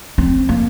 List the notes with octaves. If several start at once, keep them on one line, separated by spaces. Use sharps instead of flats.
C4
A#3